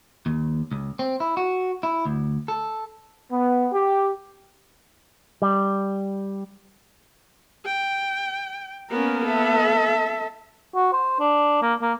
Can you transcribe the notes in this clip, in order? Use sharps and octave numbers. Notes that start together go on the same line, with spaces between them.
D#2
C#2
C4
E4
F#4
E4
D2
A4
B3
G4
G3
G5
A#3 B3 C#4 A#4
A4 E5
F#4
C5
D4
A#3
A#3